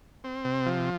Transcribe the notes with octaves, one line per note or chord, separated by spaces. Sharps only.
C4
C3
F3